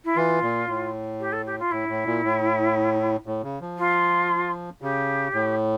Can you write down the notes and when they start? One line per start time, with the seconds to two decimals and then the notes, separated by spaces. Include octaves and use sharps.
0.04 E4
0.16 E3 F4
0.42 A#2
0.68 A2
1.20 G4
1.32 A4
1.46 G4
1.59 F4
1.71 A2 E4
1.89 A2
2.06 A#2
2.23 A2
3.26 A2
3.44 C#3
3.61 F3
3.78 F4
4.82 C#3 G4
5.34 A2